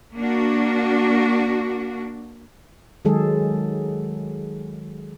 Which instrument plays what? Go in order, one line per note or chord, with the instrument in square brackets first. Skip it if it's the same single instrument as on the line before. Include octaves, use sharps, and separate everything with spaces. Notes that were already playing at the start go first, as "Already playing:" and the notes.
[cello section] A#3 D4 F#4
[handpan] D#3 F#3 G#3 G#4 A4